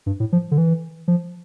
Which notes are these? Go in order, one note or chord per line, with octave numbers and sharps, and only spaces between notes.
G2
A2
F3
D3
E3
F3